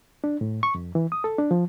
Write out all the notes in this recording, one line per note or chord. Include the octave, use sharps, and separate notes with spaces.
D4
A2
C#6
F2
E3
D#6
A4
D4
F3